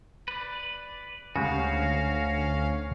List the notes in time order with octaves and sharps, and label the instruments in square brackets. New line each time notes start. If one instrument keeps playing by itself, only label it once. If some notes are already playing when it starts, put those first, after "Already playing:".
[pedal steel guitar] B4 D5
[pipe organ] D2 C#4 F5 [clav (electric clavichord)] C#3 G#3 G4 [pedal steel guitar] F#4